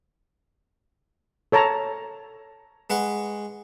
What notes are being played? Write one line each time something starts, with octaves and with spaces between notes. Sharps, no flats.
A4 C#5 A5 A#5
G#3 B4 F#5 C#6